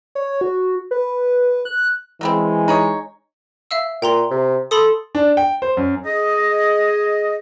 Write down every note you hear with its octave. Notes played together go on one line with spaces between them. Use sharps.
C#5
F#4
B4
F#6
E3 F#3 G#3 B3 C4
D#4 G#4 C#5
E5 F5 E6
A#2 G5 A#5 C6
C3
A4 B5 C6 D#6
D4
G5
C5
F#2
G#4 D#5